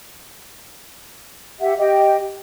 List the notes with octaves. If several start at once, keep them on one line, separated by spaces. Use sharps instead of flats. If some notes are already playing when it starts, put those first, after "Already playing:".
G4 E5 F#5
G4 D#5 G5